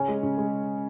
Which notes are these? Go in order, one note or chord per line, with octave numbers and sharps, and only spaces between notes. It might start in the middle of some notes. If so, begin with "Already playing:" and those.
Already playing: C#3 C#4
G#3
C#3
G#3